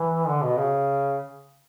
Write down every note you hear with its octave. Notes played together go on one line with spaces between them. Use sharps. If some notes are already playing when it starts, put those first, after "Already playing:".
Already playing: E3
D3
B2
C#3